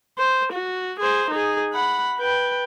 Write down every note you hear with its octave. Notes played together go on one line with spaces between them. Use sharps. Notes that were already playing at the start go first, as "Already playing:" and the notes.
C5
F#4
G#4 C5
D#4 G#4
F#5 B5
B4 G5